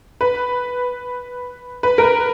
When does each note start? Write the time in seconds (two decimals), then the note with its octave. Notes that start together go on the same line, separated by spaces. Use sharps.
0.21 B4
1.83 B4
1.98 A#4
2.03 B4